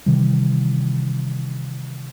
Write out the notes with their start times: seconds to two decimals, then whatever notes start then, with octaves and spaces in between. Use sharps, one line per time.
0.06 C3 D#3 E3 G3